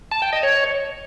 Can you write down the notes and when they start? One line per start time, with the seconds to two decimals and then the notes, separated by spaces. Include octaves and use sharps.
0.11 A5
0.22 G5
0.33 D#5
0.43 C#5